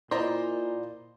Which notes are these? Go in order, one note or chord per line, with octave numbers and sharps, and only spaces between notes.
A#2 E4 C5 D5 D#5 A#5 C6